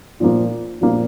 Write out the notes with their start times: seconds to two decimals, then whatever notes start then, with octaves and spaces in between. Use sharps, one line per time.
0.20 A#2 F3 A#3
0.81 A#2 F3 A#3